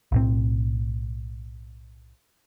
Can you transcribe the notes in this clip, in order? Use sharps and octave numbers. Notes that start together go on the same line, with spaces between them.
B1 A2 C4